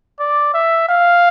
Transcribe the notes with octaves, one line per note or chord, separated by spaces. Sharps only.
D5
E5
F5